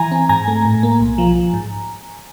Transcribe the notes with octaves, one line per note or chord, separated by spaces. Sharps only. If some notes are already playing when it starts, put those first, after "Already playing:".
Already playing: E3 G#5 A#5
C4
G#2 G#5 A#5
A3
A2
A#3
B1
F3
F3
G#2